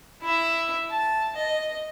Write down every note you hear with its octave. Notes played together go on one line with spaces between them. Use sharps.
E4 E5
A5
D#5